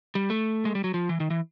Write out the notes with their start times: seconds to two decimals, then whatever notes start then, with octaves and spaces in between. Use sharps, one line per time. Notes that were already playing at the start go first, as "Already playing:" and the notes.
0.15 G3
0.30 A3
0.65 G#3
0.75 G3
0.84 F#3
0.94 F3
1.09 E3
1.20 D#3
1.30 E3